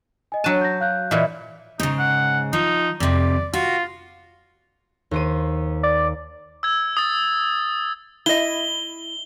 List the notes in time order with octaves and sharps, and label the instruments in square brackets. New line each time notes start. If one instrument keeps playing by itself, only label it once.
[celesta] D#5 G#5
[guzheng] F#3 A5 [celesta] D4 F#6 D#7
[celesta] G6 A#6
F5 F#6 G6
[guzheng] A#2 E3 [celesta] D5 D#5
[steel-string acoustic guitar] G#2 C#3 [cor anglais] D#4
[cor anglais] F#5
[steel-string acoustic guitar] F3 [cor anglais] D#4
[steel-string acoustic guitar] F2 C3 [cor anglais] D5
[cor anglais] F4 [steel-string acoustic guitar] F#4
[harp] D#2 C5 D#7
[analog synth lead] D5
[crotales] E6 G#6
D#6 A6
[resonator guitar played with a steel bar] E4 D#5 [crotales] G7